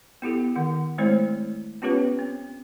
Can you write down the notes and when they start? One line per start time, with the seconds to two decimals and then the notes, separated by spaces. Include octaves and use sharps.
0.22 B3 E4 G4 A4
0.55 D#3 F#5
0.98 G#3 A3 C4 E4 C5 C#5
1.82 B3 C#4 F4 G4 B4 C#5
2.19 C4